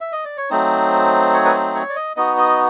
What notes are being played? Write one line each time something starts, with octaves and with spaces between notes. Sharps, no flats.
E5
D#5
D5
C#5
F#3 A3 C4 D#4 C5
C#5
B4
C5
C#5
D5
D#5
B3 D#4 F#4 D#5
D#5